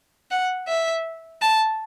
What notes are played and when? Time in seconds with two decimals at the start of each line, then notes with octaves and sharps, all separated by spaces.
0.31 F#5
0.68 E5
1.42 A5